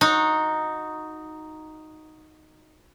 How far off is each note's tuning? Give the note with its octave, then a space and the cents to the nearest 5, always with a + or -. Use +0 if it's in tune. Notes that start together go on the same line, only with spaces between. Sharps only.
D#4 +0 F#4 -20